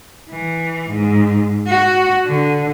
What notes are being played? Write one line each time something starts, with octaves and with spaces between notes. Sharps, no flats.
E3
G#2
F#4
D3